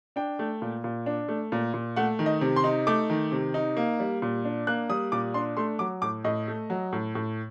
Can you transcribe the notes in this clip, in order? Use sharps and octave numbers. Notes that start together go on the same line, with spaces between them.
D4 G5
A3
A#2
A#2
D4
A3
A#2
A#2
A3 F#5
D#3
D#5
C3
C6
D#4
A3 D6
D#3
C3
D#4
A#3
G3
A#2
D4
A#3 F#6
G3 D#6
A#2 D6
D4 C6
A3 C6
F#3 D6
A2 D6
A2 D#5
A3
F#3
A2
A2